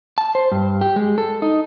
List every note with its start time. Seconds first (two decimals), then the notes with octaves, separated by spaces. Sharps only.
0.18 A5
0.35 C5
0.52 G2
0.81 G4
0.96 G#3
1.18 A4
1.42 D#4